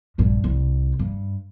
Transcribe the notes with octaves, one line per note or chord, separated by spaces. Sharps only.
A#1 G2
C2
G2